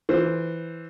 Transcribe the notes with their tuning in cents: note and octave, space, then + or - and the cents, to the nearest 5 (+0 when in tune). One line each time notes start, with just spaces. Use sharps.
E3 +0 C5 +0